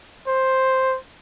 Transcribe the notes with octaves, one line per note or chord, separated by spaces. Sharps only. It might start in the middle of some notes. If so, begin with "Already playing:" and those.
C5